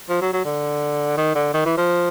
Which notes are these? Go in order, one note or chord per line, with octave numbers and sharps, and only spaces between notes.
F3
F#3
F#3
D3
D#3
D3
D#3
E3
F3